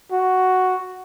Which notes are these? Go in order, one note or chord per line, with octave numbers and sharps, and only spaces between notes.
F#4